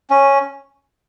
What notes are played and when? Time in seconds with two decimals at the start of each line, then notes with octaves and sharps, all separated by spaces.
0.10 C#4